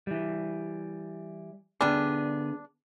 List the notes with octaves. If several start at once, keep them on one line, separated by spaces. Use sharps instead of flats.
E3 G3
D3 G3 B3 D4 G#4